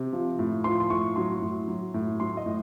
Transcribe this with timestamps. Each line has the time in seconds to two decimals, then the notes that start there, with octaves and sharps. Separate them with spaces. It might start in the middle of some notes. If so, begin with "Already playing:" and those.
Already playing: C3
0.13 F3
0.39 A2
0.64 F3 C6
0.80 C6
0.90 A2 C#6
1.16 F#3 C6
1.42 A2
1.68 F#3
1.94 A2
2.20 F#3 C6
2.37 D#5
2.46 A2